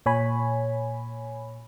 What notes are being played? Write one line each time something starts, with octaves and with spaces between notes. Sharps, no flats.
A#2 C#5 G#5 B5